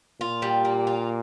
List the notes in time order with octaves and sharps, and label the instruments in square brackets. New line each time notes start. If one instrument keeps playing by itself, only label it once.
[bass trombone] A#2 [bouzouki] F4
[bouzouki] G3
A#3
F4